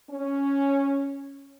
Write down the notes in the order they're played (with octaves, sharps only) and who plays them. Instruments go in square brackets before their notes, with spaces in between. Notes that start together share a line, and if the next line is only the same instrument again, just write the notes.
[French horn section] C#4